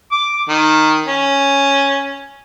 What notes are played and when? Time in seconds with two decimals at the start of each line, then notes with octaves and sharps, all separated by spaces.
0.12 D6
0.48 D#3
1.06 C#4